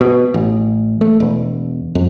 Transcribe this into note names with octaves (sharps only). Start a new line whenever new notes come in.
B2
A1
A3
E1
F2